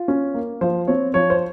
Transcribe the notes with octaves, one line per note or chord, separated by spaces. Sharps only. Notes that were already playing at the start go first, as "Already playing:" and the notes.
Already playing: F4
C#4
A#3
F3 C5
C4 C#5
F3 C#5
C5